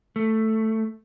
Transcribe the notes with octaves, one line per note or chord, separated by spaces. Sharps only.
A3